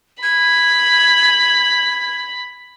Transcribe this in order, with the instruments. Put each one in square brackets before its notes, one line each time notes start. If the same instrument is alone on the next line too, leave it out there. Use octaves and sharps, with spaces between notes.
[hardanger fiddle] B5 [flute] G#6